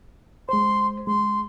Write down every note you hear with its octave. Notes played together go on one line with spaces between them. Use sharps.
G#3 C5 C6
G#3 C6